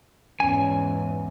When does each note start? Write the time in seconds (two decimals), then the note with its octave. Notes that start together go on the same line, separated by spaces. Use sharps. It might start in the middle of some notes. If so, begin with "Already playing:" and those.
0.40 E2 G#2 C#4 G#5